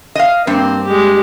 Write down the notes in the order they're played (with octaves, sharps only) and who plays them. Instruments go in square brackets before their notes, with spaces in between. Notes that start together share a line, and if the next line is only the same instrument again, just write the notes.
[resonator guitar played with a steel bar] D#5 F5
[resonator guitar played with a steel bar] G2 [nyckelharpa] A#3 C4
[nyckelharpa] G#3 G4